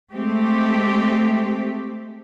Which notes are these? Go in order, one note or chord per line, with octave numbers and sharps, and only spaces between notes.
G#3 A3 C4 G4